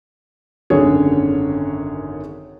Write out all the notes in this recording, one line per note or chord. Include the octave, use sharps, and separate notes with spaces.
G#1 F#2 D3 G#4 C#5